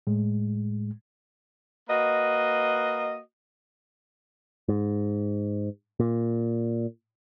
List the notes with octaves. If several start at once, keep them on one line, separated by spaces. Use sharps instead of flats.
A2 G#3
A#3 F#4 B4 D#5
G#2
A#2